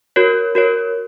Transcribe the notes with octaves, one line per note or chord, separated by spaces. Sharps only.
F#4 A#4 C#5
F#4 A#4 C#5